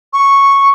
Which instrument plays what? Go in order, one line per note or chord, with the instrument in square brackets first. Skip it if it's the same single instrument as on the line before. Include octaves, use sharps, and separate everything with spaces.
[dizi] C#6